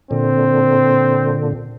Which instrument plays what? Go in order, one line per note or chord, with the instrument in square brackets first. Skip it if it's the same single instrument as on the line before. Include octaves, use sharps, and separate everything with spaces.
[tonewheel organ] A#2 D3 [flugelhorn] C4